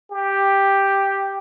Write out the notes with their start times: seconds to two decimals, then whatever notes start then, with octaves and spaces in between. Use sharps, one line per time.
0.11 G4